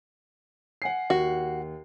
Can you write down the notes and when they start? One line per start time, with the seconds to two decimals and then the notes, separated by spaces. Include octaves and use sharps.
0.82 F#5 G#5 C7
1.10 D#2 F#4